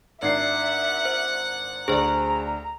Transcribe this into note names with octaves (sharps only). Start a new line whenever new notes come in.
G#1 D4 E5 F#5 C7
C5
D2 G#4 C5 D5 A#5